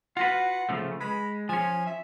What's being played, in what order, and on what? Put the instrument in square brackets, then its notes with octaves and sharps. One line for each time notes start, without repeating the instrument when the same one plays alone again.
[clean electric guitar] F4 F#4 B4 [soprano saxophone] F#5
[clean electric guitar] C#3 F3 A3
[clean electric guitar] G#3 [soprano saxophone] B5
[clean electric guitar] F3 C#4 [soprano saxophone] G#5
[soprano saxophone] E5